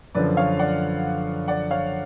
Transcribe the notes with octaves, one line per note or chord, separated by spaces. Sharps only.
F#2 D3 F3 B4 D5
C#5 F5
D5 F#5
D5 F#5
C#5 F5